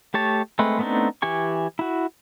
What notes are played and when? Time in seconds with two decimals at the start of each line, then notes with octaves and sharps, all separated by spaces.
0.14 A3 G4 C#5 A5
0.59 G#3 A3 C4 B4
0.79 A3 B3 C4 D4 D#4
1.22 E3 G4 G#5 C#6
1.79 E4 F#4